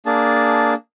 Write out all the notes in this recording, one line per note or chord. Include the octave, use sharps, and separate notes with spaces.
A#3 D4 G#4 A5